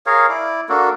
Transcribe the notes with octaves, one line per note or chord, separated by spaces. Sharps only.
G#4 A#4 C#5 F5
E4 D5
A#3 D4 F#4 A4